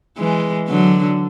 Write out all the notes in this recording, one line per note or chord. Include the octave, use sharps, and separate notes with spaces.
E3 G#3
D3 F#3